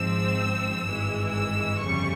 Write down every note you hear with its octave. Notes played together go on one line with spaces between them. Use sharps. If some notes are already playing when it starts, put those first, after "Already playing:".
Already playing: G#1 G#2 F3 C4 E6
G#1 G2 E3 G#3
E6
G1 F2 C#3 G3 C#6